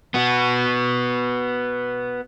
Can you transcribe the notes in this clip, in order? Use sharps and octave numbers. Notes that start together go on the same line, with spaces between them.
B3 F#4